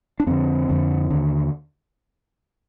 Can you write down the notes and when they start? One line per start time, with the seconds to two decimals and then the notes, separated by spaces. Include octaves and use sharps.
0.20 D4
0.27 F2 D3 C4
0.69 F2 D3
1.10 D#2 D3